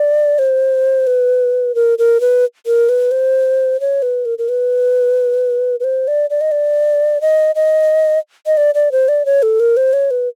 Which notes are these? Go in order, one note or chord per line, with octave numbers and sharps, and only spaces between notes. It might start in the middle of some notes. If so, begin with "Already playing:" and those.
Already playing: D5
C5
B4
A#4
A#4
B4
A#4
B4
C5
C#5
B4
A#4
A#4
B4
B4
C5
D5
D5
D#5
D5
D#5
D#5
D#5
D5
D5
C5
D5
C#5
A4
A#4
C5
C#5
B4